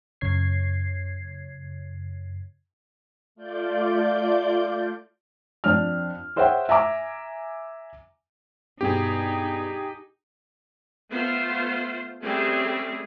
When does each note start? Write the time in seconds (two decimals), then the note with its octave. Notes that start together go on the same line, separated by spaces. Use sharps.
0.21 F#2 C#3 C#5 G#6 C7
3.35 A3 F4 D5 G6
5.64 F2 D4 F6
6.36 G#4 C5 C#5 E5 F#5 G5
6.69 E5 G#5 A#5 D6
8.81 G2 B2 D#4 G4 G#4
11.11 A3 B3 F4 C5
12.21 G3 A3 C4 C#4 G#4